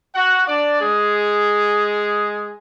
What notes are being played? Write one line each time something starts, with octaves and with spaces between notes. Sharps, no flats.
F#4 F#5
D4 D5
G#3 G#4